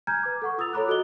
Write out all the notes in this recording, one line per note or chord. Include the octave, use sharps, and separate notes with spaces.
G#5 A#5 F6 G6 G#6
B4 D6
A4 F#5 C#6
F4 D#6 E6 A6 F7
A4 C#5 A#5 B5 D6 F#6
F#4 A4 D#5 G7